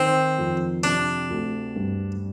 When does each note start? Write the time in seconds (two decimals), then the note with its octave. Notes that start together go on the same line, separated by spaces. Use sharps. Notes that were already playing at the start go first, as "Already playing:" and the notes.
Already playing: D#3 C4
0.38 F2
0.84 C3 D4
1.30 D2
1.76 G2